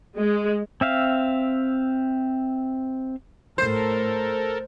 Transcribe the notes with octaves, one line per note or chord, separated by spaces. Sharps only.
G#3
C4 E5 F5
A2 A4 A#4 C5